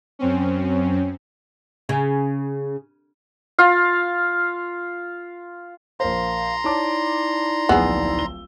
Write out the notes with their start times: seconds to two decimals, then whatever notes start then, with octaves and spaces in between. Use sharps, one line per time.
0.19 F#2 C4 C#4
1.89 C#3
3.59 F4 F5
6.00 A#1 A#4 C5 F5 A#5 C6
6.64 D#4 E4 C#5 D5 A5 D6
7.69 D1 A#1 B3 G#4 E6
8.19 G7